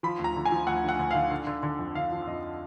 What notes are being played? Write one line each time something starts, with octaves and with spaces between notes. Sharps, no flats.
F3 B5
D2
A#5
D3
G#5
F3
D2 F#5
D3 F#5
D2
D3 F5
D3
D3
D3
F2
D3 F5
F3
F2 D#5